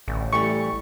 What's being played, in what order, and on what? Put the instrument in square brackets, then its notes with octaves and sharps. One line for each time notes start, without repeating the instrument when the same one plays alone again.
[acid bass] A1 [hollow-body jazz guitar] D2
[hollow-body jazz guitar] E3 G3 A3 [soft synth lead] C#6